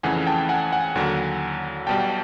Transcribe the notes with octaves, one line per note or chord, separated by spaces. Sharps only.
F2 C#3 E3 A3 F#5 G#5
G5 A5
F#5 G#5
F#5 G#5
D#2 D3 F#3
B1 B2 G3 G5 A5